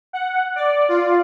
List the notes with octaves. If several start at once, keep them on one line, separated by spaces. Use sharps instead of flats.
F#5
D5
F4